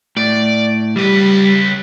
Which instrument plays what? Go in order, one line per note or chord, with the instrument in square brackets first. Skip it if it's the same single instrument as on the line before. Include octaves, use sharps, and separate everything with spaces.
[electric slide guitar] A2 [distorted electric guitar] D5
[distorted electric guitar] C#2 B4 [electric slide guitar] G3